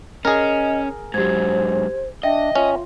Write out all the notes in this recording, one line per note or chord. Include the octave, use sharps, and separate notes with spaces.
C#4 G#4 A#4 D#5
G#2 F#3 G4 C5 G#6
D4 D#5 E5 G5 A#6
C#4 F4